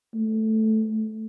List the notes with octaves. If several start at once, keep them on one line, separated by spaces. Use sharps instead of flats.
A3